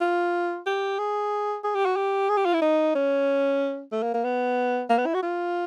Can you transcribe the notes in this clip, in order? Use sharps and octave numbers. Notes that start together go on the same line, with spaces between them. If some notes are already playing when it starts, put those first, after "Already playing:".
F4
G4
G#4
G#4
G4
F#4
G4
G#4
G4
F4
E4
D#4
C#4
A3
A#3
A#3
B3
A#3
B3
E4
F#4
F4